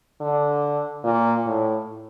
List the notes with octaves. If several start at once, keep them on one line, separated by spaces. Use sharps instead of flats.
D3
A#2
A2